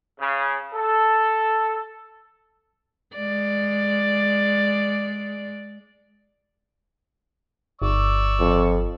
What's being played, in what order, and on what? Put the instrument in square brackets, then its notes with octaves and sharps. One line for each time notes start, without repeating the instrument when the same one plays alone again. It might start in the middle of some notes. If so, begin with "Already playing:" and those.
[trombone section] C#3
A4
[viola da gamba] G#3 D5
[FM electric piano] G1 [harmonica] D5 C#6 E6
[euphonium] F2